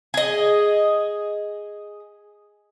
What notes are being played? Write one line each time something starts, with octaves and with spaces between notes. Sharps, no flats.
G#4 D#5